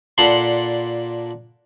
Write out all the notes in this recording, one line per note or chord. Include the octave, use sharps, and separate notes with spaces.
A#2 D4 A4 F#5 B5 C6